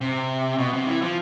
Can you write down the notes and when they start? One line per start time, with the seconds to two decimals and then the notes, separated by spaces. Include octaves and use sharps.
0.01 C3
0.58 B2
0.73 C3
0.87 E3
1.02 F3